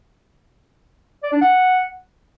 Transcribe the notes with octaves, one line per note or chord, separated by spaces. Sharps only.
D5
D4
F#5